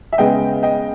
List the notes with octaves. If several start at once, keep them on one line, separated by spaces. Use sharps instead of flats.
E5
C#3 G#3 B3 D#5 G5
D#5 G5